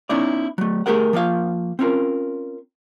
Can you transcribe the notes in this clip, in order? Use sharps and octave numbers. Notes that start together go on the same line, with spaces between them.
B3 C#4 D#4 E4 D5
F#3 A3
A3 G4 G#4 A#4 F#5
F3 A#3 F4 F5
C4 C#4 F4 A#4